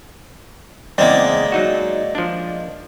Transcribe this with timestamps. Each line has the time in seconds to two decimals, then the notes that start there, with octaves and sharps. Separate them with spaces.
0.98 E2 C#3 G#3 A#3 C4 D5 D#5
1.52 F#3 D#4 F#4
2.15 F3 D4